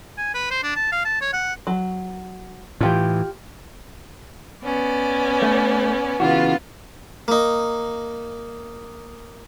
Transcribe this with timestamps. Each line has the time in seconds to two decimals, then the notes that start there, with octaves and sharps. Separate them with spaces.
0.18 G#5
0.35 B4
0.51 C5
0.64 D4
0.76 A5
0.92 F5
1.05 A5
1.22 C#5
1.33 F#5
1.67 F#3
2.81 A2 E3 F4 G4
4.63 B3 C#4 D5
5.42 A3
6.20 C#3 E3 B3 F4 F#4
7.28 A#3 D#4